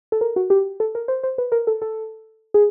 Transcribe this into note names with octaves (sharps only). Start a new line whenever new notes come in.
A4
A#4
F#4
G4
A4
A#4
C5
C5
B4
A#4
A4
A4
G#4